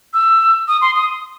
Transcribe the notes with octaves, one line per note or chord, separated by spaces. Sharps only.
E6
D#6
C6
D#6